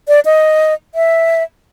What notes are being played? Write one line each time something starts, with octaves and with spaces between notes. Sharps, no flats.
D5
D#5
E5